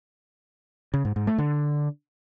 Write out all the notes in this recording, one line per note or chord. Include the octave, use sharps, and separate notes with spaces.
C#3
G#2
G#2
A3
D3